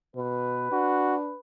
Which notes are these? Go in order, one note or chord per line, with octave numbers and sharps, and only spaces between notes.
B2 B4
D4 F#4